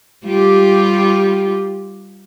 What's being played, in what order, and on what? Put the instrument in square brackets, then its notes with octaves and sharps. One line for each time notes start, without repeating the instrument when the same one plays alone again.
[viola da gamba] G3 F4 G4